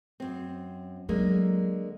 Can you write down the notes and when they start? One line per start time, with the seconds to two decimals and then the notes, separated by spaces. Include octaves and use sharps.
0.20 F#2 C4
1.09 D3 F#3 G#3 A#3